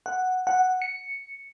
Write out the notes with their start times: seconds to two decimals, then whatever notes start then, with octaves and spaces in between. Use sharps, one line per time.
0.06 F#5
0.47 F#5
0.82 C#7